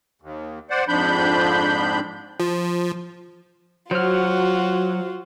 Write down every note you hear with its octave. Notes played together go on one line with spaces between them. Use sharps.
D#2
C5 D5 F#5
F2 G#2 F3 D4 B5 G6
F3
F#3 F4 F#4 C5 F6